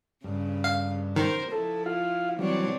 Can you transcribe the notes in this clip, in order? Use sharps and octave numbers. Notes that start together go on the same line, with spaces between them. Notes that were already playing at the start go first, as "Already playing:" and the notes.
G2 C#3
F5
D#3 A#4 C5
F3 E4 A4
F4 F5
E3 F#3 G3 C4 D4 C#5